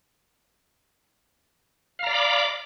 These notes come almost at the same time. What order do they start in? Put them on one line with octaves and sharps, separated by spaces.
F5 A#5 D5 B5 D6